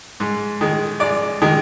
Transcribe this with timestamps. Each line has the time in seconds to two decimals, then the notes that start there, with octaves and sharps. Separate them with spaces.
0.20 G#2
0.61 D#3 G#3
1.00 G#2 D5
1.42 D#3 G#3